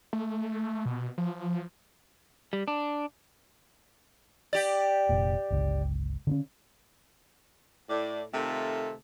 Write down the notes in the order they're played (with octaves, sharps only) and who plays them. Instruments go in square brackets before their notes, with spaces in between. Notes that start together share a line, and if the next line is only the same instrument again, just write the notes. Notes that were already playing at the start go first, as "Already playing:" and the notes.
[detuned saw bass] A3
B2
F3
[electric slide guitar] G3
D4
[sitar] G4 D5
[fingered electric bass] F1 A#2
G1 C#2
D3 C4 C#4
[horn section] A2 D5
C3 D#3 A3 F4 A4